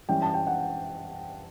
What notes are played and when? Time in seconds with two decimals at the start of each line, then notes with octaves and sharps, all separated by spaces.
0.09 E3 G3 C#4 G5
0.22 A5
0.34 G5
0.47 F#5